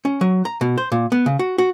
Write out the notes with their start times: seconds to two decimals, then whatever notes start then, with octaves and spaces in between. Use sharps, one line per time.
0.05 C#4
0.21 F#3
0.45 A#5
0.61 B2
0.78 C5
0.92 A#2
1.12 B3
1.26 C#3
1.39 F#4
1.58 F#4